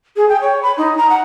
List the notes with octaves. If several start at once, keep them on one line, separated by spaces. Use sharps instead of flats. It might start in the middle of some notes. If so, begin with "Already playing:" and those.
G#4
G5
C#5
B5
D#4
A#5
F#5